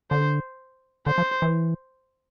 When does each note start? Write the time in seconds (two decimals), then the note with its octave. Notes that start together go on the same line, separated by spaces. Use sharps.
0.11 D3 C5
1.06 D3 C5
1.18 F3
1.42 E3